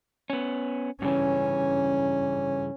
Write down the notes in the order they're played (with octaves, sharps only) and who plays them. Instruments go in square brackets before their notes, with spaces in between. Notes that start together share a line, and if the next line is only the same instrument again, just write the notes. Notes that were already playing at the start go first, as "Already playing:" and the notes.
[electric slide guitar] B3 C#4
[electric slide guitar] G2 C#3 E3 [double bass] C#4